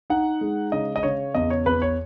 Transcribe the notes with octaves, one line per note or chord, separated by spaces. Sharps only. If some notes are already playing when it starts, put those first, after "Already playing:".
D#4 F#5
G#3
C#3 D#5
D#5
C#3 C#5
E2 D#5
C#5
E2 B4
C#5